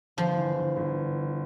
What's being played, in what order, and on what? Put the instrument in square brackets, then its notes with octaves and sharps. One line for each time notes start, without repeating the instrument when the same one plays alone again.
[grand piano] G1 [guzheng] F3
[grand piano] E3
G1
G1